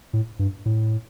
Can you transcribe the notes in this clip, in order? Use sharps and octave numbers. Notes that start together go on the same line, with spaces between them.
A2
G2
A2